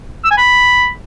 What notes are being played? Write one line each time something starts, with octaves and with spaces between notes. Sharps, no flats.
E6
G#5
B5